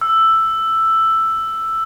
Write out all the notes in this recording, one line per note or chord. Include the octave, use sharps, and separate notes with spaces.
E6